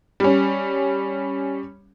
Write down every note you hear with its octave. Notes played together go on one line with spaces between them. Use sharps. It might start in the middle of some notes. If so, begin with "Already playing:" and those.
G3 C#4